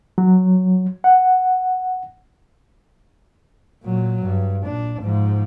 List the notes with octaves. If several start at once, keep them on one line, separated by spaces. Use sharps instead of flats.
F#3
F#5
A#2 F#3
G2
A#2 D4
G#2 F3